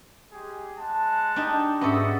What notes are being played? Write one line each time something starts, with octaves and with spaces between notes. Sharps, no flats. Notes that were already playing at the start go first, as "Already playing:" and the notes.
G#3 G4 G#4
G#3 F#5 A5
D4 D#4 G4
G#2 B3 C#4 F#4 A4 E5